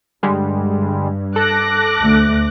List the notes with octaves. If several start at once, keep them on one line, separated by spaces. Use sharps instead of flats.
G2 D3 G3 G#3
A4 D6 F#6 A#6
D2 A3